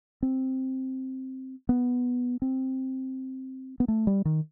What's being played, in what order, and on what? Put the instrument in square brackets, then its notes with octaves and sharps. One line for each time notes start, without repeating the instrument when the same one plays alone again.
[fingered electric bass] C4
B3
C4
B3
A3
G3
D#3